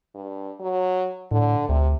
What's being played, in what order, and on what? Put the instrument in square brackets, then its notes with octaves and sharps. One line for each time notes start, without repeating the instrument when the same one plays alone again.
[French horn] G2
F#3
[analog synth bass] A2 [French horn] D3
[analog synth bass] D2 [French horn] C3